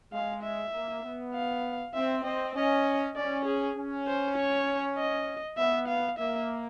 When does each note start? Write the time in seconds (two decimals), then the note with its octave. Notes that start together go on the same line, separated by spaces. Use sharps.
0.12 G#3 F5
0.43 E5
0.73 A#3
1.03 B3
1.34 F5
1.94 C4 E5
2.24 C4 D#5
2.55 C#4 D#5
3.16 C#4 D5
3.45 G#4
3.76 C#4
4.07 C5
4.37 C#5
4.98 D#5
5.58 B3 E5
5.88 F5
6.19 A#3 E5